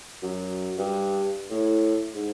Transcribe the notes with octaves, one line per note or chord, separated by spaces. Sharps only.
F#2
G2
A2
G#2